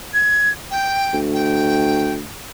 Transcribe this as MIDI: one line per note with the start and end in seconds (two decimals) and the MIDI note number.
0.13 0.50 92
0.71 1.17 79
1.13 2.27 38
1.33 2.13 79